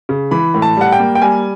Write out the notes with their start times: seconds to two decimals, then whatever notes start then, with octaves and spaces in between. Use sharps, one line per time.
0.09 C#3
0.31 E3 B5
0.54 A2
0.62 A5
0.77 G3 F#5
0.92 G5
0.99 A#3
1.15 G5
1.22 G3 G#5